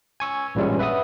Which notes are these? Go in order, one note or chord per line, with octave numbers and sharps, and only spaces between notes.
G#5 C#6 E6
A1 G2 A#2 G3 G#3 C#4
B4 E5 F#5 D#6